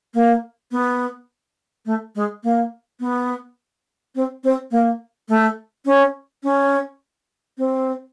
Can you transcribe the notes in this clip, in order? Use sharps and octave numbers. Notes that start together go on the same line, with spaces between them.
A#3
B3
A3
G#3
A#3
B3
C4
C4
A#3
A3
C#4
C#4
C4